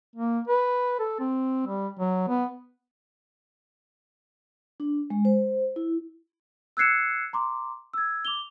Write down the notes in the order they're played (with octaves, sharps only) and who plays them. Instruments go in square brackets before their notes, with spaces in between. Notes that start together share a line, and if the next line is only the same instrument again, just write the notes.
[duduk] A#3
B4
A4
C4
G3
F#3
B3
[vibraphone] D4
G#3
C5
E4
[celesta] E6 F#6 G#6 C7 C#7 E7
A#5 C6 D6
E6 G#6
D6 F7 G7